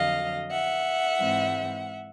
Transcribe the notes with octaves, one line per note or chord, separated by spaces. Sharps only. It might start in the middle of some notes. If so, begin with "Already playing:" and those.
Already playing: F2 D3 F#3 D#5 F5
E5 F#5
G#2 E3 G#3 C4